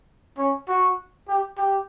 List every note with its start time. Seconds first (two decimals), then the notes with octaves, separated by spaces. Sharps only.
0.38 C#4
0.68 F#4
1.28 G4
1.57 G4